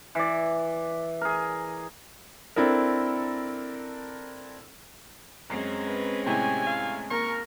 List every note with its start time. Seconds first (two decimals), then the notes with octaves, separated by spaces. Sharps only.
0.15 E3 D5
1.21 G#4 A#4
2.56 C4 D4 E4 A4 A#4
5.50 F#2 G#3 C4 C#4 C7
5.86 B4
6.27 A2 C3 E3 G4 G#5
6.66 F5
7.11 D#2 A#4 C#6